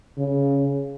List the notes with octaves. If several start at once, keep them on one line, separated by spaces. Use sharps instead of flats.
C#3